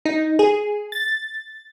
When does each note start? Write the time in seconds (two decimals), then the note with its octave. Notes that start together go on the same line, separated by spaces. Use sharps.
0.05 D#4
0.39 G#4
0.92 A6